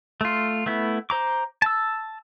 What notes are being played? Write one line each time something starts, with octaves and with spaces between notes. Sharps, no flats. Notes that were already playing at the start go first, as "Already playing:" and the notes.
A3 F4
A3 B3 E4
C5 A#5 D6
A5 E6